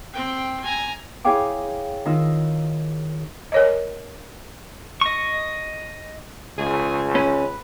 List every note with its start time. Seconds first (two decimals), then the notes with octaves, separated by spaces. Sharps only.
0.13 C4 G5
0.64 G#5 A#5
1.24 E4 G#4 C#5 F5 G5 D6
2.06 D#3 D#4 F4 E6
3.52 A#4 C#5 D#5
5.01 D#5 C#6
6.58 C#2 G#4
7.15 C#4 B4